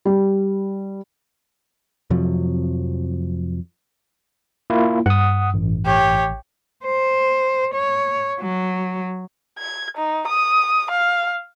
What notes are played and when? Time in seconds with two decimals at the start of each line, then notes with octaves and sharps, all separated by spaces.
0.05 G3
2.10 F2 C3 F3 F#3
4.70 A#3 E4 F4
5.06 G2 F#5 D#6
5.54 A1
5.85 G4 C#5
6.86 C5
7.74 C#5
8.41 F#3
9.58 G#6
9.97 D#4
10.27 D#6
10.90 F5